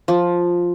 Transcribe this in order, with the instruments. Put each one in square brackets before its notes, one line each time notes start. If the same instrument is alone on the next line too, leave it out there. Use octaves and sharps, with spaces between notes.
[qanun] F3